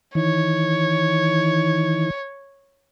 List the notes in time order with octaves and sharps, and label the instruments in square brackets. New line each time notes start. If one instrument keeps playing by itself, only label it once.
[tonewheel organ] D#3 E3 [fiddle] C#5